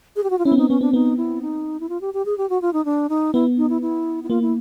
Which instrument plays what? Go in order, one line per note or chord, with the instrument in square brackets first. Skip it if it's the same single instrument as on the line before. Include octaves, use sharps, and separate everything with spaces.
[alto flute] G#4
G4
F#4
F4
[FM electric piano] C#4 [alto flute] E4
[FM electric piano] B3
[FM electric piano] C4 [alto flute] D#4
[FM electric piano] B3 [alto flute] C#4
[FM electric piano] C4 [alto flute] D4
[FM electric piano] B3 [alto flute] D#4
[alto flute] E4
D#4
E4
F4
G4
G4
G#4
G4
F#4
F4
D#4
D4
D#4
[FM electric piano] B3 [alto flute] E4
[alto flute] D#4
E4
E4
E4
[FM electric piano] A#3 [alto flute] F4
[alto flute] E4